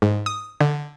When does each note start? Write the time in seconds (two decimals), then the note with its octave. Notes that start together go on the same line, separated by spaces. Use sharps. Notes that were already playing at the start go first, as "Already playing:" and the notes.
0.02 G#2
0.26 D#6
0.61 D3